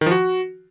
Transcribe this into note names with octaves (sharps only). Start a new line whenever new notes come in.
D#3
F3
F#4